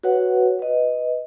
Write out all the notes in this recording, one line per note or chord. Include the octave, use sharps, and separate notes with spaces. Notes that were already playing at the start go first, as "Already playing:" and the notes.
F#4 B4 C#5 F#5
B4 D#5